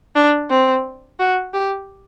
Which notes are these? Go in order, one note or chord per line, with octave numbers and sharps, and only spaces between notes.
D4
C4
F#4
G4